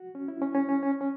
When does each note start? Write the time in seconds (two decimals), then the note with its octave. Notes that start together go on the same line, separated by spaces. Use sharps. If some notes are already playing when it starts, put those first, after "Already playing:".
Already playing: F#4
0.15 C#4
0.28 E4
0.42 C#4
0.55 C#4
0.69 C#4
0.83 C#4
1.01 C#4